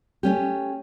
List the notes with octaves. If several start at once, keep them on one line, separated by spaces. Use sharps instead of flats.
A3 C#4 G4